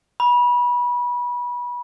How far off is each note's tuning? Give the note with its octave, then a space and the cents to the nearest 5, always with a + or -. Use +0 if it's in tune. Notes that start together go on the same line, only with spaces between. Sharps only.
B5 -25